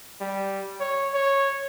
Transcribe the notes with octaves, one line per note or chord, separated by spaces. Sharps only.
G3
C#5
C#5